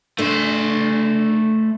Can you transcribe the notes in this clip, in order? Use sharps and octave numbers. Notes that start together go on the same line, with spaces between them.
D3 A3 C5